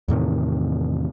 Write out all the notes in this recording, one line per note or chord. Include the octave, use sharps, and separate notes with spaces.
E2 A2 C3 D#3